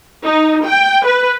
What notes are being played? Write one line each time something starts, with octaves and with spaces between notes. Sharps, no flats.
D#4
G5
B4